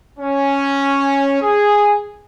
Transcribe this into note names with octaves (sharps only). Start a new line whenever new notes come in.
C#4
G#4